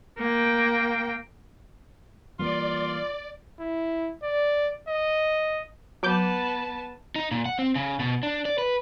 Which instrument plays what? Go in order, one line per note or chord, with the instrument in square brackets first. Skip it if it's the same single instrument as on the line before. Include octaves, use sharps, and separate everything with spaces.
[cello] A#3 G5
[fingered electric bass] E3 G3 A#3 [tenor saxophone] F4 [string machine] D5
[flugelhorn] E4
D5
D#5
[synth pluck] F#3 D6 G6 [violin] B3 A5
[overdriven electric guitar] D#4
A#2
F#5
C4
C#3
B2
D4
D5
B4